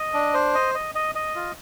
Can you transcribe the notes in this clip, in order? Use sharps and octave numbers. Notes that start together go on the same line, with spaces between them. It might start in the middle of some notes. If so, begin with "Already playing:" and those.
Already playing: D#5
D4
C5
D#5
D#5
D#5
D#5
F4